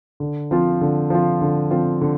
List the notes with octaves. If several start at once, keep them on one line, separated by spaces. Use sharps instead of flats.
D3
F3 C4 F4
D3
F3 C4 F4
D3
F3 C4 F4
D3